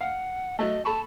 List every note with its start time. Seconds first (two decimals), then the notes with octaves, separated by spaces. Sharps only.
0.01 F5 F#5
0.59 F#3 A3 D#5
0.85 A4 A5 B5 C#6